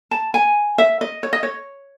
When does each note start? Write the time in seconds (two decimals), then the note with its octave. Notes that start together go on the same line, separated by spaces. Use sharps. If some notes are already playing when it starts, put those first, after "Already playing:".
0.11 A5
0.34 G#5
0.78 E5
1.01 D#5
1.23 C#5
1.33 D#5
1.43 C#5